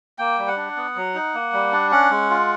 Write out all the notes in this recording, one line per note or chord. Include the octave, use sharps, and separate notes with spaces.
A#3 G5
G3
F#5
D4
B3
F#3
D#4
A#3
G3
D4
C#4 F#5
G#3
F4